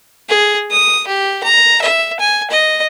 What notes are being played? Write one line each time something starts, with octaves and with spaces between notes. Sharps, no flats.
G#4
D#6
G4
A#5
E5
G#5
D#5